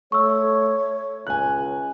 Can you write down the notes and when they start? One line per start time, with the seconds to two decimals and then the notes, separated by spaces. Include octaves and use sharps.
0.12 A3 C#5 C#6 E6
1.27 C#2 G#5 F#6